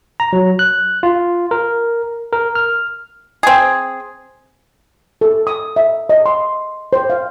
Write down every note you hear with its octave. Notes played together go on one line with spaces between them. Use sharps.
A#5
F#3
F#6
F4
A#4
A#4
F6
C4 G#4
A4
D#6
E5
D#5
C6
C5
F5